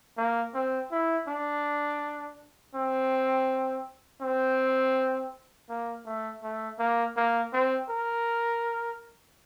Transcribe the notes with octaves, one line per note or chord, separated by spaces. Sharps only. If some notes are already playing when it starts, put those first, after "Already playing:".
A#3
C4
E4
D4
C4
C4
A#3
A3
A3
A#3
A#3
C4
A#4